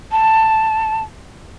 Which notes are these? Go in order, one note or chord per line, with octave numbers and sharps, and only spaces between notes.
A5